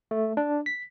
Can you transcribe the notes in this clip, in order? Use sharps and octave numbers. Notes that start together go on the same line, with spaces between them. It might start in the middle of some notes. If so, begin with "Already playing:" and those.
A3
D4
B6